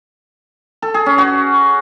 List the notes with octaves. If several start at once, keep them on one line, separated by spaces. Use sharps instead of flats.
A4
G#4
C#4
F#4